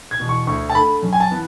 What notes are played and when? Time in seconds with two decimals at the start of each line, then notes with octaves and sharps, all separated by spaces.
0.11 G#6
0.20 E2 B2
0.29 C#6
0.47 D2 C#6
0.70 A5
0.75 D3 A3 B5
1.02 F#2
1.13 G#5
1.20 A5
1.30 E3 B3